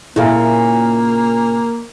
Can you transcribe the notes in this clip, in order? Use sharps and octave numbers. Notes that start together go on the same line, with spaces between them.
A#2 C#3 A#3 E4 A4 F5